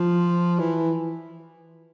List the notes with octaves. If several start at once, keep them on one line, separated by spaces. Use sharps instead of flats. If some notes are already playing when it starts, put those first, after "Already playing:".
Already playing: F3
E3